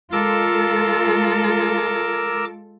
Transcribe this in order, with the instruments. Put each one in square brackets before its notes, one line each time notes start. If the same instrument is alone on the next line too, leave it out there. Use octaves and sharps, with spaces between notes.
[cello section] G#3 F4 A4 [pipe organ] A#4 D6 E6